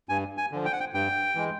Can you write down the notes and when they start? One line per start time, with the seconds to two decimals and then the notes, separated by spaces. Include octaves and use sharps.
0.09 G2 G#5
0.37 G#5
0.52 D3 F3
0.65 G5
0.73 F#5
0.80 G5
0.94 G2 G5
1.35 E3 G#3